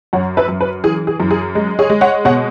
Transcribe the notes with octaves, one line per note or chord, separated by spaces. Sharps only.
F#2 C#5 F#5
B4 E5
F#2
B4
E3 G#4
G#4
F#2
G#4
G#3
G#4 C#5
G#3
C#5 F#5
B2 C#5 F#5